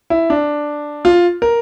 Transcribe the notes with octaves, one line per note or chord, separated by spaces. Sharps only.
E4
D4
F4
A#4